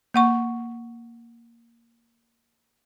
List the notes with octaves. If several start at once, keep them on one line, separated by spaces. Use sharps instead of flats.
A#3 F#5 C#6